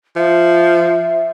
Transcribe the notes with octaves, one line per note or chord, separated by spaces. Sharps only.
F3 E5